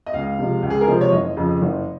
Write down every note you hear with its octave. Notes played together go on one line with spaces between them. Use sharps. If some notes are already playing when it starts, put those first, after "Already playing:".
D#5
C#2 F5
C3 F3 G#3
C#2
G#4
A#4
C3 F3 G#3 C5
C#5
F#1 D#5
F2 C#3 F3
F#1